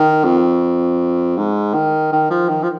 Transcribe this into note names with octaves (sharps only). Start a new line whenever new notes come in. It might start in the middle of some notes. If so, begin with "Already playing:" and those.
Already playing: D#3
F2
G#2
D#3
D#3
F3
D#3
F3